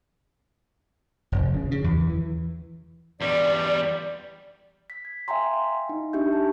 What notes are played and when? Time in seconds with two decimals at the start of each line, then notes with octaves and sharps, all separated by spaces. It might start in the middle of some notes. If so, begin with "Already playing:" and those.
1.32 F1
1.54 C#3
1.71 C#3
1.84 E2
2.10 E3
3.21 E2 G3 D5
4.90 B6
5.05 G#6
5.28 E5 F5 G5 G#5 A#5 C6
5.89 D#4
6.13 D4 G4 E5 G6
6.33 A5